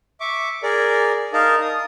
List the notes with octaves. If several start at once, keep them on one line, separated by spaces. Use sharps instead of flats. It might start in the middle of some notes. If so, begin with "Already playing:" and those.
E5 C#6 D6
G#4 A#4 D5
D#4 A#4 F5 A5
D#6